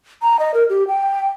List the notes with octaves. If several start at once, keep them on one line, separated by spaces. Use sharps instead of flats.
A#5
D#5
A#4
G4
G5